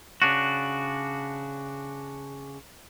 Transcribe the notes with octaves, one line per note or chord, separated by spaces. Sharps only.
C#3 D4 F#4